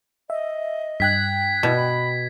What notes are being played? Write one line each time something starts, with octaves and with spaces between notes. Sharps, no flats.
D#5 E5
G2 G5 F#6 G#6 B6
B2 E4
B5